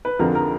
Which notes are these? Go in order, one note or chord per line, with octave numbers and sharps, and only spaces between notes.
B4
F2 D3 F3 G#3 A#4
A#4